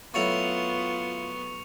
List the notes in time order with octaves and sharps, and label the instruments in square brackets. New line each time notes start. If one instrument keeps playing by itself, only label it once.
[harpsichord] F#3 A3 E4 [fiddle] B3 [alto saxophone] F4 [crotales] C#6 C#7 F7